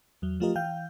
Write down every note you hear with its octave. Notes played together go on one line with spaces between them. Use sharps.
E2 F#3
F3 A3 F4 G4 A#4 D#5
E3 F5 G5 G6